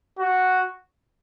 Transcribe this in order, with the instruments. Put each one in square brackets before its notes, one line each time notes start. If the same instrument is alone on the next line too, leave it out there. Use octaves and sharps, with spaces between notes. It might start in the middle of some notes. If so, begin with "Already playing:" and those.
[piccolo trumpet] F#4